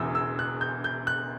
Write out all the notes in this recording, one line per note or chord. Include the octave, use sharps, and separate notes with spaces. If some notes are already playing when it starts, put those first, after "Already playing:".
Already playing: E1 E2 C#3 E3 D#6 E6
E6
F#6
G6
G6
F#6